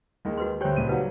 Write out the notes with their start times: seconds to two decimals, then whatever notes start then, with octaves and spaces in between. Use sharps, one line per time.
0.25 D#2 D#3 G#3
0.37 F#4 B4 C6
0.61 D2 G4 C5 C#5 G5
0.76 C#2 A#2 D#7
0.89 F#3 G3 D#4 B4 F5